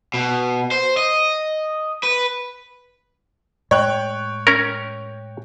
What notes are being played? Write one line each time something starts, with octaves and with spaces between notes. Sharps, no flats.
B2
C5
D#5
B4
A2 G#3 C#5 G5 F#6
C#4 A#4